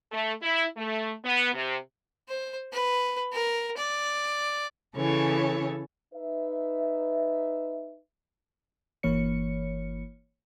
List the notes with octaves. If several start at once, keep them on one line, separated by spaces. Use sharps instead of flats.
A3
E4
A3
B3
C3
C5
B4
A#4
D5
C#3 E3 A4 C#5
D#4 B4 E5
G1 E3 A#3 C#5 C#7